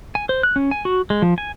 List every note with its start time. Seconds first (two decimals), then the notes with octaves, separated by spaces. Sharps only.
0.15 G#5
0.29 C5
0.43 F#6
0.56 C#4
0.71 G#5
0.85 F#4
1.10 G#3
1.22 F3
1.38 G#5